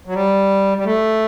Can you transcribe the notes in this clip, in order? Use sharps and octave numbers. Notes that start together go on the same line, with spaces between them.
F#3
G3
G3
A3